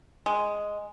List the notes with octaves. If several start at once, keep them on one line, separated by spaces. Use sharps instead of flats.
G#3